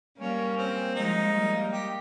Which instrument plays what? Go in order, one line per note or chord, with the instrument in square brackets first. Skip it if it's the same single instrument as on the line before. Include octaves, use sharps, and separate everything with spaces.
[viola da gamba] G3 A#3 [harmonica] C#4
[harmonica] C4
[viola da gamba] F3 G#3 [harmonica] D#4
[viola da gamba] G3 A#3
[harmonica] G4